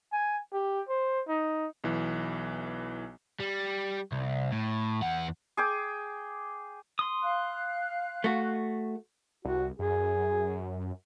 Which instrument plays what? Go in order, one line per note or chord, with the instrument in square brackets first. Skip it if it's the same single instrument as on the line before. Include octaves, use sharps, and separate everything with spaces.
[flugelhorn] G#5
G4
C5
D#4
[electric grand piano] B1 E3
[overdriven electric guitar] G3
C2
A2
E2 F#5
[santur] G#4 G5 D6
[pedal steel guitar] C6 D#6
[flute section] F5 F#6
[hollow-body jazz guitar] A3 F#4
[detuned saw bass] C2 [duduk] F#4
[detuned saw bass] F#2 [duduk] G#4